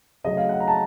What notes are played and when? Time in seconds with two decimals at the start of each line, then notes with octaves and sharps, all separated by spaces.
0.24 C#3 F#3 A3 D#5
0.37 F5
0.49 F#5
0.60 A#5
0.68 A5